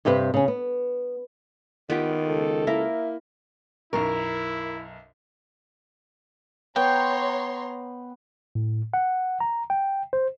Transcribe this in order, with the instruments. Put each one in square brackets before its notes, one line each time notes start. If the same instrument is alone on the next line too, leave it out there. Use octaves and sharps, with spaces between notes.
[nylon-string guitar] G2 C3 G4 B4 C5
C#3 C#4
B3
[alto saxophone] D#3 [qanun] B3 F4 G4
[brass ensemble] C#2 A4
[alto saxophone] A#3 [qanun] E4 A#4 [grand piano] E5
[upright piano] B1 F#2 C#6 [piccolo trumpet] E4 [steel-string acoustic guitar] A#4
[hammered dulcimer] B3 [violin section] C#5 A#5 C6 [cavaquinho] G5
[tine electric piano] A2
F#5
A#5
G5
C5